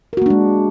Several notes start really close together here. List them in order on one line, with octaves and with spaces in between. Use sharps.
A#4 F#4 A#3 D4 G#3